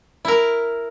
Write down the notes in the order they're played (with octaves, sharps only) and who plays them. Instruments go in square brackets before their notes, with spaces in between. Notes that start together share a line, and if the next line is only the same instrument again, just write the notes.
[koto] E4 A#4